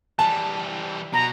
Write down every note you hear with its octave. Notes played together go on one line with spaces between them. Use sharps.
E3 G3 A5
B2 A#5